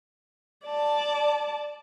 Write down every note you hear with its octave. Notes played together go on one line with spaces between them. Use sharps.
D5 A5